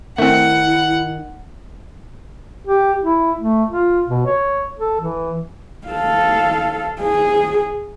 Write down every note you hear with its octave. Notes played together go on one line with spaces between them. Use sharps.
D#3 A3 C4 E4 F#5
G4
E4
A3
F4
B2
C#5
A4
E3
A4 F5
G#4